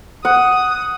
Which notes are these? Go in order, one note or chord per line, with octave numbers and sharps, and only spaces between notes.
F#5 D#6